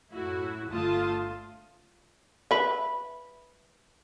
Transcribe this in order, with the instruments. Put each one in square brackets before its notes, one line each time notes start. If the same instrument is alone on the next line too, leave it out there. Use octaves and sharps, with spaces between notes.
[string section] F#2 A2 E4 F#4
G1 D3 A3 F4 A5 D#6
[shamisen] B4 E5